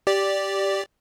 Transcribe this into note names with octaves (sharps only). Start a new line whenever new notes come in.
G4 D5